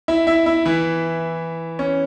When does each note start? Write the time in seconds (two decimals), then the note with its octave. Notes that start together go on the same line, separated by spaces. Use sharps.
0.08 E4 E5
0.27 E4 E5
0.46 E4 E5
0.65 E3 E4
1.79 C#4